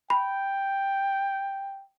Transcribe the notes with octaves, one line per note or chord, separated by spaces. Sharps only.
G5 B5